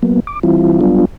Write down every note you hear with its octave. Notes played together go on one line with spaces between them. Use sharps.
F#3 A#3 B3
D6
E3 G3 C4 E4 F4
F#3 G3 B3 D4 F4